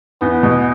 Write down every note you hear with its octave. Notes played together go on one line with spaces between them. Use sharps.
E2 B3
B2